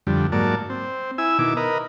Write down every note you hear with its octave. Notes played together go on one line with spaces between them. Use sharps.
F2 D3 G3
G#2 F#3 A#3 D5 A5
C4
E4 G#5 E6
B2 D#3 E4 D6
A#4 B4 D#5